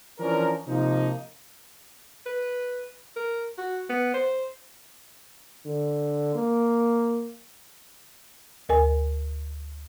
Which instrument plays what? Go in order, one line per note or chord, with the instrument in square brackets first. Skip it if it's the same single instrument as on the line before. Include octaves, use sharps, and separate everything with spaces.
[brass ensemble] E3 F3 C#4 D4 A#4
C3 F3 A#3 D#4
[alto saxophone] B4
A#4
F#4
B3
C5
[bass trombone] D3
A#3
[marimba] D2 A#4 G#5